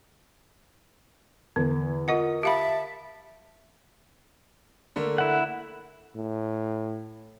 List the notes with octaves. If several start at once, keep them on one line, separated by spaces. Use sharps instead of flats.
E2 D3
F4 A#4 D#5 F#5 D#6
G4 E5 F5 A5 B5
D3 A3 A#3
E4 F#5
A2